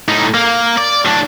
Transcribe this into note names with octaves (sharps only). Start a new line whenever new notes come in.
A2 D#4
A#3
D5
A2 D4